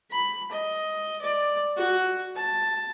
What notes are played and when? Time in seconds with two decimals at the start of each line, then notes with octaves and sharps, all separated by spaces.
0.11 B5
0.52 D#5
1.22 D5
1.77 F#4
2.36 A5